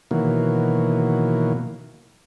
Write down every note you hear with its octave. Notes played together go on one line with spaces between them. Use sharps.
B2 D#3 E3 F#3 A#3